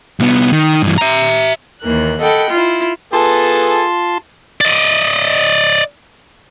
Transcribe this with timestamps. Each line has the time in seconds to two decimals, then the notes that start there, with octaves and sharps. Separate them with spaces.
0.20 C2 B3
0.52 D#3
0.83 G2 E3
0.98 E5 A#5
1.82 D#2 E3 A#3 F#6
2.21 A4 D#5 F#5 G5 B5
2.51 E4 F4
3.13 B3 F4 G#4 A4 A5 C6
4.61 D5 D#5